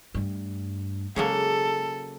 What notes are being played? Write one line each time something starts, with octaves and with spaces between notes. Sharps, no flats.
G2 A3
C#3 F#3 G#3 A#3 A4